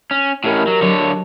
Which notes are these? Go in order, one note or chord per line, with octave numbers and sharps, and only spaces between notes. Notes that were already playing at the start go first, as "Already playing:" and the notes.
C#4
A2 C#4 G4 A#4 D#5
F#3
D3 F#3 C#5 A5
F#4